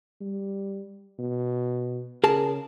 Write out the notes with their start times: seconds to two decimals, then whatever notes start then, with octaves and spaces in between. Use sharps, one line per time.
0.21 G3
1.19 B2
2.24 C#3 G#4 A#4 A5